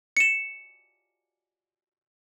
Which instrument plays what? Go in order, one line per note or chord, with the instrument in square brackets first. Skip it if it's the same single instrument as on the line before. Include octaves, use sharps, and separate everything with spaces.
[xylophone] C#7 E7